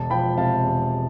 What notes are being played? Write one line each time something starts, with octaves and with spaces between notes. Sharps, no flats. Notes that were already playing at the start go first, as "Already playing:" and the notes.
Already playing: E1 A5
F3 G5 B5
C3 F5 A5
E2